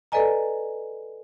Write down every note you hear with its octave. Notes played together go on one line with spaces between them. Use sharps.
A4 B4 D5 D#5 G#5 A#5